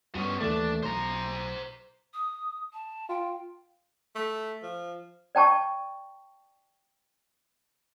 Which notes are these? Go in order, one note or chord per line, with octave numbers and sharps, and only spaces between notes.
G2 B3 C#4
D#2 E3 A3 D4
B1 C5 A#5
D#6
A5
F4 G5
A3
F3
D5 G5 A5 C#6